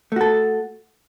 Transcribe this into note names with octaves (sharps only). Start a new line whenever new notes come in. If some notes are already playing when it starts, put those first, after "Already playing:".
A3 F#4 A4